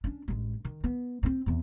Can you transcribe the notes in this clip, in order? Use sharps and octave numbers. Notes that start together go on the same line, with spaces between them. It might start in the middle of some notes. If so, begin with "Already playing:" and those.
C#4 D4
A1 G#3
D#3
B3
G2 C4
E2 C4